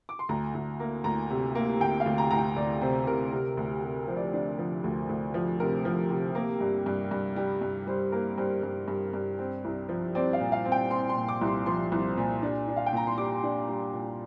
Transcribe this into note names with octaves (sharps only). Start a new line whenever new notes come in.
D6
C6
D2 A#5
D2
A#3
D2 A#5
C3
A#3
D2 G5
F5
D2
A#5
D2 A#5
G5
D2 D5
C3 C5
C3 A#4
C3
D2
C3
F3 C5
D5
C5
D4
F3
D2
D2
F3
C3 A#4
F3
C3
A#3
G2
G2
G2
G3
G2
G3 C5
A#3 A#4
G2 C5
G2
G2
G2
C4
C2
F3
C4 D5
F5
A#2
F5
C4
G5
C4 C6
C6
A#2
D6
C2
C6
F3 C6
C2
A#2
D4
D4
F5
G5
A#2 A#5
C6
G3 D6
D4
G3
A#2